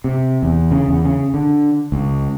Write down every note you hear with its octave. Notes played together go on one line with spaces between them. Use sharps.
C3
E2
C#3
E2
C#3
D3
C#2